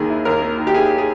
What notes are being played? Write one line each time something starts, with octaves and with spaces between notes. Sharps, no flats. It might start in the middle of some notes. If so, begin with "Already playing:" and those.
Already playing: D#2 D#3 A#3 G#4
E4
D#2 A#4
A#3
D#3
G4
E4 G#4
G#4